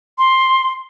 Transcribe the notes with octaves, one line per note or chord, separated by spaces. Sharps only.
C6